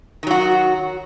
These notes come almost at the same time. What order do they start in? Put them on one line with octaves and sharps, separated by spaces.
D#3 F#3 F#4